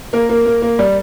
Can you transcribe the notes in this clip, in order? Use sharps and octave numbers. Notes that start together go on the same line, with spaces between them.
A#3 A#4
A#3
A#3
A#3
G3